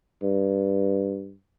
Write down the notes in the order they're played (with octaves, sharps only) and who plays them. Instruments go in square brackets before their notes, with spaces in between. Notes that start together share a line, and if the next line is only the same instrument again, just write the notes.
[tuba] G2